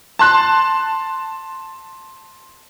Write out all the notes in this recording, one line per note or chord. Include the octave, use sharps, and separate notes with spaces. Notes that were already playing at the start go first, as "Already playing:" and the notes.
A5 C6 F#6